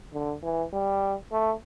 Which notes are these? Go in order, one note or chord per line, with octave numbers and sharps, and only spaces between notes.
D3
E3
G3
A3